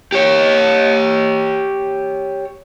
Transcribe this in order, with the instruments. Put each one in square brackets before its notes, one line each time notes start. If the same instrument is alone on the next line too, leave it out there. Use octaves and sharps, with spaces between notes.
[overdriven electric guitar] G4 C#5